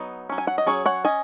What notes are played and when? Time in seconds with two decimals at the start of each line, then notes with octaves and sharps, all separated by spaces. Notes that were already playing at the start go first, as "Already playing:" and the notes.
Already playing: F#3 B3 D#4
0.29 F#3 C#4
0.38 G#5
0.47 F#5
0.58 D#5
0.66 F#3 C#4 G#4 C#5
0.86 C#5 F#5
1.04 C#4 D#5 G#5